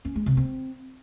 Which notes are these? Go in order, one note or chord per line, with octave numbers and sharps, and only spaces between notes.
C#4
G#3
C3
C4